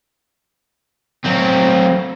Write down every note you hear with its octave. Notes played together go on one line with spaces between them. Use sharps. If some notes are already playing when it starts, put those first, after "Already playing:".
F#3 C4